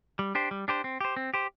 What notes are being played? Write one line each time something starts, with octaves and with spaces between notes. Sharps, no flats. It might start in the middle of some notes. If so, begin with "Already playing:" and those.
G3
D4 G4 C5
G3
D4 G4 C5
C4
G4 C5
C4
G4 C5